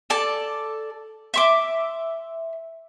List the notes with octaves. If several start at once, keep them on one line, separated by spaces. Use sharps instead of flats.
A4 D5 A5
E5 C6 D6